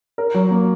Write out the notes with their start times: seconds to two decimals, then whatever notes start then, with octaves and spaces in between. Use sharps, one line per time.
0.18 A#4
0.34 F#3
0.51 A#3